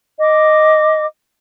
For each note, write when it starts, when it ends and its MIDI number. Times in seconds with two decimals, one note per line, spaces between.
0.20 1.06 75
0.20 1.06 86